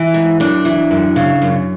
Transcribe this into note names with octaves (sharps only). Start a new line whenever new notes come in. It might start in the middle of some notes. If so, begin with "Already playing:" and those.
Already playing: E3
G#2
F#2 D4
E3
F#2
C#3
F#2